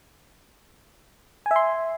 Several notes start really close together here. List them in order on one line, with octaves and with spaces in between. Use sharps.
G#5 E5 C6